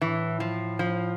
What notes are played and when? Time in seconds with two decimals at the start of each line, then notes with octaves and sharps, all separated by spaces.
0.01 A2 E3
0.40 F3
0.79 F3